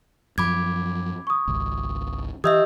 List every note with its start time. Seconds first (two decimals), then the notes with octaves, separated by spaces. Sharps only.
0.38 F#2 F3 B5 D6 G#6
1.27 C#6 D#6
1.48 G#1 C#2
2.44 E3 G4 D#5 E5 D#6 E6 G6